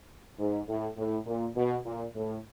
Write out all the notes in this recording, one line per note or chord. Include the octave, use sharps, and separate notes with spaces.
G#2
A2
A2
A#2
B2
A#2
A2